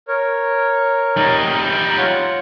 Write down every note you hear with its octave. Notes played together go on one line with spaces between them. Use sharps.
A#4 C#5
G3 D#4
F4 C#5 F#5